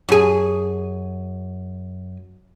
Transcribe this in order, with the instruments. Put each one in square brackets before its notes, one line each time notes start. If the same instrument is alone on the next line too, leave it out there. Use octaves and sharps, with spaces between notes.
[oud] F#2 G#4